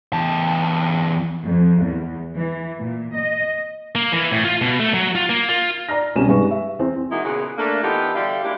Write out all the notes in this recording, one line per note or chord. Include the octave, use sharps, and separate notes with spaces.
E2 A5
F2
E2
E3
A#2
D#5
A#3
E3
A2
F4
B2
A3
F#3
F4
A#3
F4
D5 A#5 F6 A#6
C2 B2 C#4 G4 E7
G2 G#3 D#4 B4 C#6
E5
E2 C4
A#2 D#3 G#3 D#4 E4 F#4
E2 A#2 C#3 F#4 G#4
A3 A#3 D4
E3 B3 D#4 F4 G4 A4
D3 G3 F#4 G4 E5 F5
G3 G#3 A#3 D4 E4 G4